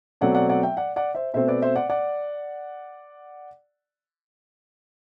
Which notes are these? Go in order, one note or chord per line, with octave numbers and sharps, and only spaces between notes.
B2 F#3 A3 C4 D5 F#5
D5 F#5
D5 F#5
E5 G5
D5 F#5
D5 F#5
C5 E5
B2 A3 C4 C5 E5
B4 D5
C5 E5
D5 F#5
D5 F#5